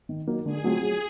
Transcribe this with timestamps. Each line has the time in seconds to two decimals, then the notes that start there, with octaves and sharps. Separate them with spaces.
0.09 D#3
0.27 F#3 A#3 D#4
0.46 D3 G#4
0.64 F#3 A3 C4 F4
0.82 F#3